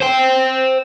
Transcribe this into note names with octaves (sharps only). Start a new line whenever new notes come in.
C5 G5